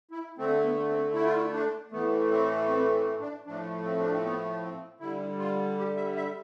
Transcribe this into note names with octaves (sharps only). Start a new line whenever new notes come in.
E4
D3 A3 C4
B3
C4
E4
F4
E4
D4
A2 E3 A3 B3
C4
C4
C4
D4
A2 F3 A3 D4
C4
D4
C4
B3
C4
D3 G3 E4
F4
G4
E5
E5